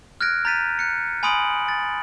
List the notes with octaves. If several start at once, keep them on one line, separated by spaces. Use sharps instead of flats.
F6 F#6 G#6 A#6 D7
A#5 G6 A6 B6 D#7
F#6 C#7
G#5 B5 C6 D#6 D7 F#7
A6